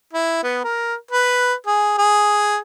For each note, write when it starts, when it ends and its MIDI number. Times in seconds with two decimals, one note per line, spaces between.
0.13 0.42 64
0.43 0.62 59
0.64 0.95 70
1.12 1.54 71
1.67 1.98 68
1.98 2.58 68